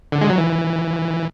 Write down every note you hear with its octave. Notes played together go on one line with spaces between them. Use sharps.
D3
G#3
F#3
E3